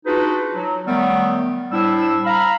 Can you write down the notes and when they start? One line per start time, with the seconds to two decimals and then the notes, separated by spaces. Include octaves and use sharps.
0.05 D4 D#4 F4 F#4 G#4 B4
0.54 F#3
0.87 D#3 F#3 G3 A3 B3
1.71 A2 G3 D4 E4 C5 E6
2.25 F5 A#5 B5